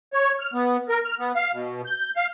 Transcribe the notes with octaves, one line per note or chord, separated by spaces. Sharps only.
C#5
F6
B3
A#4
F6
B3
F5
B2
G6
F5